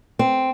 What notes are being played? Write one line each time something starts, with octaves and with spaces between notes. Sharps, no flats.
C4